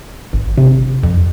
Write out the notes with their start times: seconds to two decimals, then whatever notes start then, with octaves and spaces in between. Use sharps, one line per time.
0.33 G#1
0.58 C3
1.03 F2